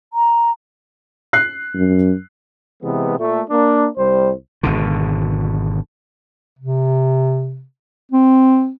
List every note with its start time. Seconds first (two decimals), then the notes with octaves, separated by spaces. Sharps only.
0.13 A#5
1.33 F#6 C7
1.74 F#2
2.83 C3 E3 G#3 B3
3.18 A#2 A3
3.50 A#3 D4
3.98 C2 G3 C5
4.63 G#1 B2 D3
6.59 C3
8.11 C4